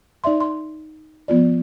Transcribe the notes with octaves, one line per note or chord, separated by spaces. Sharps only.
D#4 D5 E5 C6
C6
F3 B3 F4 D5